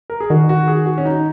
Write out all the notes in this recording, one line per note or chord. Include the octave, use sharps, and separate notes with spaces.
A#4
G#4
D#3 F#4
F#4
G#4
F#4
C#4
D#4